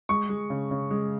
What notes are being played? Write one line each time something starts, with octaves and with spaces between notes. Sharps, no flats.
G#3 C#6
G#3
C#3
C#3
G#3